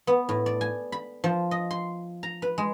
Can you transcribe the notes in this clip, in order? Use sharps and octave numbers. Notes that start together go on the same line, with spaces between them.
B3
A2
D5
G#5
B5
F3
D#5
C6
A#5
B4
G#3